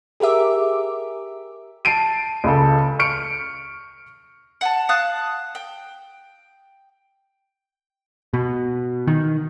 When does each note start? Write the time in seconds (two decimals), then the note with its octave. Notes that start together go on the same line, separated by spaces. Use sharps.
0.20 G4 G#4 A#4 E5 D6
1.85 A5 C7 D7 D#7
2.44 C#2 C#3 A4
2.99 C#6 F6 C#7 D7
4.61 F#5 G#5 A5
4.89 F5 A5 D#6 F#6
5.55 G5
8.33 B2
9.08 D#3